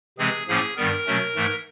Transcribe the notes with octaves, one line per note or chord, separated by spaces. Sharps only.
C3 E3 G#3 C4 G#4
A2 F3 A#3 C#4 G#4
G2 D#3 G3 B3 A#4
B2 F#3 A3 C#4
G#2 E3 A3